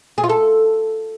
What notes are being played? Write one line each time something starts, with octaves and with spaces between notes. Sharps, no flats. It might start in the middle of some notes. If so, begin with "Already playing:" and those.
G#4
F4
A4